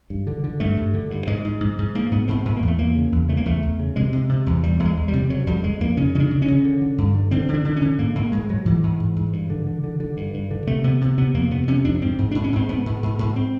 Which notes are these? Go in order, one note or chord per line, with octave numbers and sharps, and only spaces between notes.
G2
D3
D3
G2 A3
G2
D3
G2
G#2 G#3
G#2
G#2
G#2
G#2 A#3
G#2 B3
G#2 C4
G#2 B3
A#3
E2
A3
E2 A#3
C#3
E2
C#3 A3
A#3
E2 A3
E2
C#3
C3 G#3
C3
C3
E2
E2 G3
E2 A3
G#3
E2
G3
C3
C#3 F#3
F2 G3
F2 G#3
F2 A#3
C#3 C#4
C#3 C#4 D4
C#3
C#4
C#3
D3
D3
G2
D3
D3 C4
D3
D4
D3
C#4
D3
G#2 A#3
G#2 A#3
G#2 G#3
G#2 F#3
G#2 E3
G#2
G#2
G#2
G2
D3
D3
D3
D3
G2
G2
D3
C3 A3
C3 B3
C3
C3 B3
F2 A#3
C3 B3
C3 C#4
F2 D4
G#2 C4
G#2
G#2 D4
C#4
G#2 C4
G#2 B3
G#2
G#2
G#2
C4